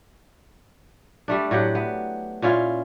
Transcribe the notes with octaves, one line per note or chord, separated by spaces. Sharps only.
G3 A3 D4
A2 F#3 G4 F#5
B3
A#2 C#4 E4 F4